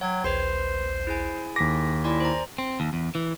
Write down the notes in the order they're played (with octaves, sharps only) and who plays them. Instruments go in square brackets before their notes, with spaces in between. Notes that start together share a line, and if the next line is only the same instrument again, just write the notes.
[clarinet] F#3 [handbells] C#5 G5 G#6 [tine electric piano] F#5
[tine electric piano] A#1 D#2 [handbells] B4 C6 [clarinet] C5
[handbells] E4 G#4 G#5
[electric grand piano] D#2 A#6 [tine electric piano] D6 B6
[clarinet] E4 [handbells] D5 G#5 C6
[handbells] C5 A#5
[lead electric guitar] C4
D#2
E2
E3